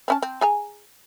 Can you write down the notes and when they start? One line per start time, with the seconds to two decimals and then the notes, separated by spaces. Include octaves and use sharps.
0.08 C4 C#4 A5
0.22 C4
0.41 G#4 G#5 A#5